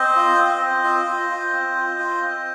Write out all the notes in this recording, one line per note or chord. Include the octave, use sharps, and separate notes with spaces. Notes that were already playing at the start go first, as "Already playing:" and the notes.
Already playing: C4 C5 D#5
F4
C4
C4
F4
F4
F4
C4
F4
F4
C4